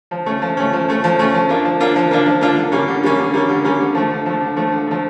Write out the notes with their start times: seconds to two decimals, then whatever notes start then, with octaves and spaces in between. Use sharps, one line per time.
0.11 F3
0.26 A3 C#4
0.42 F3
0.57 A3 C#4
0.73 F3
0.88 A3 C#4
1.04 F3
1.19 A3 C#4
1.34 F3
1.49 A#3 D4 F4
1.65 F3
1.80 A#3 D4 F4
1.96 F3
2.11 A#3 D4 F4
2.26 F3
2.41 A#3 D4 F4
2.56 D3
2.72 G3 A#3 C#4
2.88 D3
3.03 G3 A#3 C#4
3.18 D3
3.34 G3 A#3 C#4
3.49 D3
3.65 G3 A#3 C#4
3.80 D3
3.95 F3 A3
4.10 D3
4.26 F3 A3
4.41 D3
4.56 F3 A3
4.72 D3
4.87 F3 A3